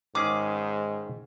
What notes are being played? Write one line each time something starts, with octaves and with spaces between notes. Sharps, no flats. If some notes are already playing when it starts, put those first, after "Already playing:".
G#2 D#3 C#4 G#4 D6